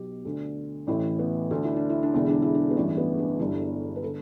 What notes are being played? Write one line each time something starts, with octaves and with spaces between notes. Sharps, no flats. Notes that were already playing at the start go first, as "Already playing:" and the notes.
Already playing: B1 B2 G4
D2 D3
A1 A2 E3 E4
B3
D2 D3 D4
E4
D4
E4
D4
E1 E2 D3 E4
D4
E4
D4
B3
A1 G2 E3 D4
B3
D4
G1 G2 D3 E4
B4
A4
D3